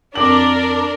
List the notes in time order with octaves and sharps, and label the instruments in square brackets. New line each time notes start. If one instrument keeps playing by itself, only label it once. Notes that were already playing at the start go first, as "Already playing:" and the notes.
[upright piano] F2 D6 F#7 [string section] D4 A#4